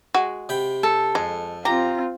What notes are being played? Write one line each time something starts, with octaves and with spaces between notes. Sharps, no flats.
G#3 F#4
C3 G5 B5
A4
F2 G#3
C4 F4 G4 A#5